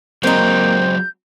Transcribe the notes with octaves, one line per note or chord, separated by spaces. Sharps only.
F#3 G#3 A#3 C4 D#4 G6